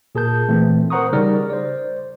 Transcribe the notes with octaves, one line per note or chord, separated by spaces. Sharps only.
A#2 G#4 A#4 A5 G6
A#2 E3 A3 C4
A#4 C5 F#5 A#5 C#6 D#6
C#3 G3 D#4 G#4 A#4 D5
C5 D5